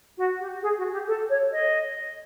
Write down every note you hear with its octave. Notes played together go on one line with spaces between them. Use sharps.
F#4
G4
G#4
F#4
G4
A4
C#5
D#5